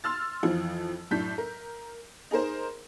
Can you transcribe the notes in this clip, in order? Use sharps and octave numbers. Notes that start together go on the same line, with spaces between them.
C6 E6 F6 A6
F2 E3 F3
F#2 A2 D4 G6 B6
A#4
D#4 G#4 A#4 C5